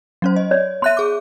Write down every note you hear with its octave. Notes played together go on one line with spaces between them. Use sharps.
F#3 C#4 C5
D#5
C#5 D5
B3 E5 C6 F#6 D#7
G#4 D6